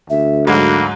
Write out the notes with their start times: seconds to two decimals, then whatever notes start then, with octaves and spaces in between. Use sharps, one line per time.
0.10 D2 E5
0.47 G#2 F#3 G#3 A#3 B5